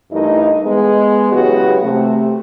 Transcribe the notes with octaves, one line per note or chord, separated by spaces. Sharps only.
G2 E3 A3 D#4 A#4 D#5
G#3 B3
C#3 E3 F#3 B3 F#4 G4
C3 A3